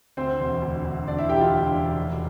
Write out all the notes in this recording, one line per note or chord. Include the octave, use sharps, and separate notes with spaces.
D2 C4 C5
E1
D2
D2
D2 D4 D5
E4 E5
E1 G4 G5
F4 F5
D2
E1
F1